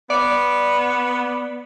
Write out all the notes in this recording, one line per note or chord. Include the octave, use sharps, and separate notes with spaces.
B3 D5